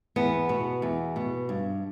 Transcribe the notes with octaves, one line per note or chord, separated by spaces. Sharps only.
E2 B3
B2
E2
B2
G2